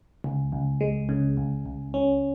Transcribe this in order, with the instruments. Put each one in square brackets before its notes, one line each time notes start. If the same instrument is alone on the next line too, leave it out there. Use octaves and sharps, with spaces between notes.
[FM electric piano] C#2
C#2
G#3
C#3
C#2
C#2
C#4